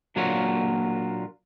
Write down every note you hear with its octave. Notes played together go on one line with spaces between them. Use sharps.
A#2 F#3 A#3 D4 F4 C#5